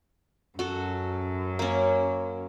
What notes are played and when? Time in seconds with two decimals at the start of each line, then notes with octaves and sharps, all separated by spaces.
0.59 F#2 F#4 A4
1.59 A#3 C#4